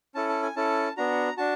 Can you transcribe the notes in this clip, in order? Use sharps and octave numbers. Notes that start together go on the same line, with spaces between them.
C#4 E4 A4 A5
A5
G#5
C#4 E4 A4 A5
B3 D4 F#4 A#5
D4 F#4 A5